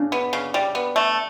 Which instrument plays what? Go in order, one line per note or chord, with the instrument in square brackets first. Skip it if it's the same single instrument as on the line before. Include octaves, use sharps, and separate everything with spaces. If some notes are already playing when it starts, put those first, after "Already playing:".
Already playing: [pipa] C#3 [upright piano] D4
[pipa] B3
C#3
G3
B3
A3